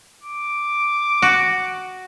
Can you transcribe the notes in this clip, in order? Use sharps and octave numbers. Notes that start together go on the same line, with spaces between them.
D6
F#4